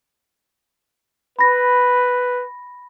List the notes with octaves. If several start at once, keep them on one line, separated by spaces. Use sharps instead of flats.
B4 B5 A#6